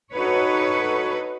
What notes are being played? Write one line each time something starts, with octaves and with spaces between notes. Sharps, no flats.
D#4 F#4 A4 B4 C#5